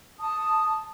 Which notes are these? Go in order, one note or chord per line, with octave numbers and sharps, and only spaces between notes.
A5 D#6